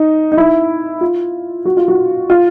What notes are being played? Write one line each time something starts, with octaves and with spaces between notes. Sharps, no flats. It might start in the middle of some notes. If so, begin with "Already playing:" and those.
Already playing: D#4
D#4
E4
F4
F#4
F4
F#4
F4